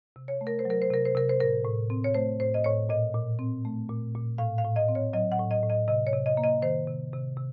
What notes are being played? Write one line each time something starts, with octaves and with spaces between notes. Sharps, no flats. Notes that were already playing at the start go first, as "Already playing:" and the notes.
C3
C#5
A3
A#4
C5
F#3 A#4
C5
C3 A#4
C5
C3 A#4
C5
A2 A#4
A2
C4
C#5
A3 C5
A2 C5
D#5
A2 C#5
A#2 D#5
A#2
C4
A3
A#2
A#2
A2 F5
F5
A2
D#5
C4
C#5
F#3 D#5
F#5
A2
D#5
A2
D#5
C3 D#5
C#5
C3
D#5
A#3
D#5
D#3 C5
C3
C3
C3